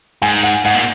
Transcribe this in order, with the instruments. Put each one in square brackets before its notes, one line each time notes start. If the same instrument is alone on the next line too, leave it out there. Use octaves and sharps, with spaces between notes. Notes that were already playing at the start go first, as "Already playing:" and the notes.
[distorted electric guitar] G#2 [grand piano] G#5
[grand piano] F#5
[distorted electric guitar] G#2 [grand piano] F#5
[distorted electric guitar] A#2